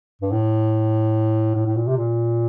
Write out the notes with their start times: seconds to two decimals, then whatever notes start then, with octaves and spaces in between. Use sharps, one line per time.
0.21 G2
0.31 A2
1.55 A2
1.66 A2
1.76 A#2
1.87 C3
1.97 A#2